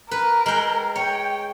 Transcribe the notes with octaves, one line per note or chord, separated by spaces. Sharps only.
A#4 B4
G#3 G5
C#5 G5